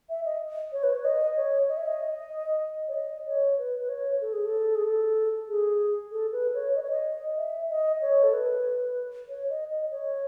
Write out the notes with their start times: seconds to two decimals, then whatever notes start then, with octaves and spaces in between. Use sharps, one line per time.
0.09 E5
0.25 D#5
0.72 C#5
0.83 B4
0.93 C#5
1.05 D#5
1.36 C#5
1.69 D#5
1.77 E5
1.87 D#5
2.88 C#5
2.94 D#5
3.27 C#5
3.58 B4
3.80 B4
3.89 C#5
4.21 A4
4.33 G#4
4.45 A4
4.75 G#4
4.84 A4
5.49 G#4
6.12 A4
6.32 B4
6.54 C#5
6.75 D#5
6.82 C#5
6.91 D#5
7.38 E5
7.70 D#5
8.01 C#5
8.23 A4
8.34 B4
9.29 C#5
9.50 D#5
9.71 D#5
9.91 C#5